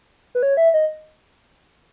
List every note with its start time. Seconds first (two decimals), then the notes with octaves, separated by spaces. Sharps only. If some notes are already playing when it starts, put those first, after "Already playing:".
0.35 B4
0.43 C#5
0.57 E5
0.74 D#5